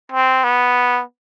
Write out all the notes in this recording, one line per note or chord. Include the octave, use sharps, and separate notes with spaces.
C4
B3